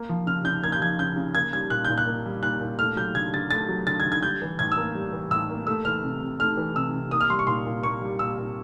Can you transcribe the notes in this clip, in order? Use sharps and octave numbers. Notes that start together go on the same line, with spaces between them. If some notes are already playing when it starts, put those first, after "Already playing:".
Already playing: A#3
F3
C#3 F6
C#3 G6
A#3 G#6
G6
F3 G#6
C#3 G6
C#3
A#3 G#6
G3 G#6
A#2 F#6
A#2 G6
F#6
A#3
G3
A#2 F#6
A#2
A3 F6
F#3 G6
D3 G#6
D3 A6
A3 A6
F#3
D3 A6
G#6
D3
G#6
G3 G6
E3
A2 G#6
E6
A#3
G3
E3
A2 E6
A#3
A3 E6
E3 F6
C3
C3
A3 F6
E3
C3 E6
C3
A#3 D#6
F6
G3 C6
C#6
A#2 C6
A#2
A#3 C#6
G3
A#2 E6
A#2